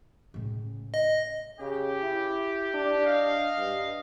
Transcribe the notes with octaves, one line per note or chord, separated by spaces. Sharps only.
A2 C#3
D#5
C#3 G4
E4
D4
D#5 F5
G2